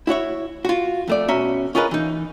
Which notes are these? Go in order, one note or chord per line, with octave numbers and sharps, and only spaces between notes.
E4 F#4 C#5 E5
F4 F#4
F2 A3 D5
B2 C#4 E5 A#5
C#4 F4 G#4 A#4 B4 D#5
E3 D#4